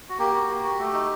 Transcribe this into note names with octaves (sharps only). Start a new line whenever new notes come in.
F#4
A#3 G4
F#4
A#3
F#4
A3
D#4